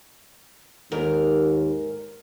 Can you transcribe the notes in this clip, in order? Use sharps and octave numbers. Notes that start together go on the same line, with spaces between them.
D#2 G#2 A#4